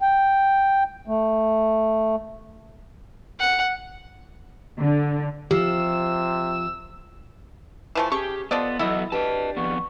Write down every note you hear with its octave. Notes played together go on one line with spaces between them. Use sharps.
G5
A3
F#5
D3
C3 F3 G4 E6
E3 F3 A3
C#4 G4 G#4 C#6
F3 B3 A4 C5 D5 D#5
E3 F#3 B3 E4 A4 D#5
D4 G4 B4 D#5 A5
F2 B3 C#6